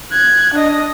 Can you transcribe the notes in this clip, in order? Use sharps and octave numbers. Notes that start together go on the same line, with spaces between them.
F#6 G#6
D4 D#5